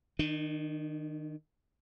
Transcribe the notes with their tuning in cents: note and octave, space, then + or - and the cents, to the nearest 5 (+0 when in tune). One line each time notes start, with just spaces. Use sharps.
D#3 +0 D4 +45